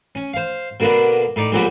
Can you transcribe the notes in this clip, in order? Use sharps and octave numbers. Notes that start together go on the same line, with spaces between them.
C#4
C5 F5
B2 D3 A#3 B3 D4
A2 D#4 D5
A#1 A#2 D3 F#3 B3 G4